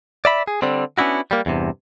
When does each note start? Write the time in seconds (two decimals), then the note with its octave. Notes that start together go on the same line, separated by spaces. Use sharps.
0.25 D5 E5 B5
0.48 G#4
0.62 D3 G3 C4
0.98 B3 C#4 D4 E4 F#4
1.31 G3 A#3
1.46 E2 G2 C3